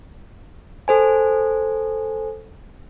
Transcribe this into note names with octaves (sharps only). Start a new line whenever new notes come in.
A4 C5 G#5